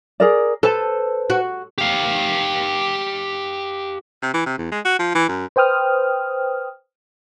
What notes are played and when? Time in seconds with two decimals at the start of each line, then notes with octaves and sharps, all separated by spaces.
0.20 G#4 A#4 D5
0.63 A4 B4 C5 A5
1.30 F#4
1.78 G4 F5
4.22 C3
4.34 E3
4.46 C3
4.58 E2
4.71 G#3
4.85 F#4
4.99 F3
5.15 E3
5.28 F#2
5.56 B4 C5 G5 D#6 F6